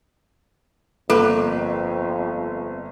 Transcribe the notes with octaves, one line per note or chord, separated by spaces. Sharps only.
G1 F2 A#3 A4 B4 E5